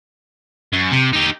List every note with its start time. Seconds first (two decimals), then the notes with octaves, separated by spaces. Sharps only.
0.73 F#2
0.92 C3
1.13 D#4 G4